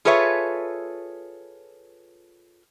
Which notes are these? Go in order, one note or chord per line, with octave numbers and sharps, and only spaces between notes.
F4 G#4 A4 B4 C#5 E5